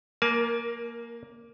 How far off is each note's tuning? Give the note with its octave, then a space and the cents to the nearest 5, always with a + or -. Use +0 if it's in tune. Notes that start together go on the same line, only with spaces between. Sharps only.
A#3 +0 A#4 +25 A5 -45